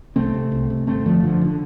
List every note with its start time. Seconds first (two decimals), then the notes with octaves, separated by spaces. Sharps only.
0.16 C2 A3 C4
0.34 C3
0.52 C2
0.70 C3
0.87 G1 A3 C4
1.05 F2 D3 F3 A3
1.23 G1 D3 F3
1.42 D#3
1.44 D3